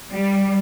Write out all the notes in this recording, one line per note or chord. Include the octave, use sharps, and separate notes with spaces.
G3